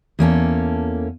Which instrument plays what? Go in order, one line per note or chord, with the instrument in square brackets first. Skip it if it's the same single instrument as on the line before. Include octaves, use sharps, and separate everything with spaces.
[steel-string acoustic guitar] E2 A#3 C#4 A4